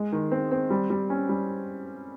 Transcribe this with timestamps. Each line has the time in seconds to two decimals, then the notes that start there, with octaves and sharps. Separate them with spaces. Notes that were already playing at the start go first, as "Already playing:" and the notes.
Already playing: G#3
0.12 D#3
0.32 C4
0.51 C4
0.70 G3
0.90 G3
1.10 C#4
1.29 G3